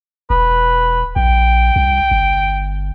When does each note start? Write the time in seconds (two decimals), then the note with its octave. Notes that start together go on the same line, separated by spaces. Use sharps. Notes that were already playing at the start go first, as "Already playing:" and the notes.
0.30 E1 B4
1.16 A#1 G5
1.76 C2
2.11 G1